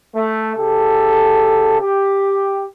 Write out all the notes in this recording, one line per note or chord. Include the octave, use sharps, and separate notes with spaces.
A3
C#3 G4 A4
G4